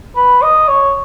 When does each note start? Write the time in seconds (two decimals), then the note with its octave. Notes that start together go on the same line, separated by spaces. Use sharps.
0.16 B4
0.42 D#5
0.68 C#5